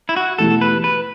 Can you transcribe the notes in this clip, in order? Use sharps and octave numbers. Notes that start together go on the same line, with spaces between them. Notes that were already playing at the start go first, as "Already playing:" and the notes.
E4
F#4
E2 B2 A3 E4 G4 A4
B4
B4